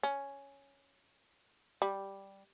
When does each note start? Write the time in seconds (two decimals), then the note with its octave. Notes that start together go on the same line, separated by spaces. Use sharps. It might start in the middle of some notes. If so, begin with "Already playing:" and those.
0.03 C#4
1.82 G3